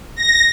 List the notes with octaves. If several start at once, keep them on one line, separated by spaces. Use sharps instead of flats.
A#6